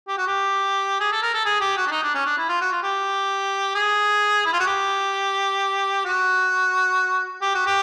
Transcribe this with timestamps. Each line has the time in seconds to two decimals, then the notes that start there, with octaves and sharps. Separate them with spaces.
0.08 G4
0.18 F#4
0.27 G4
1.00 G#4
1.12 A4
1.22 A#4
1.34 A4
1.45 G#4
1.61 G4
1.77 F#4
1.86 D4
1.91 D#4
2.03 D4
2.14 C#4
2.26 D4
2.38 E4
2.49 F4
2.61 F#4
2.72 F4
2.83 G4
3.75 G#4
4.45 E4
4.53 F4
4.59 F#4
4.66 G4
6.05 F#4
7.41 G4
7.54 F#4
7.66 G4